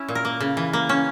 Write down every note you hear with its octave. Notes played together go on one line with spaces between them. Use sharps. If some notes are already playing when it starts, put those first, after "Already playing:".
Already playing: C#4 E4
A#2
A#4
A#3
C#3
E3
A#3
C#4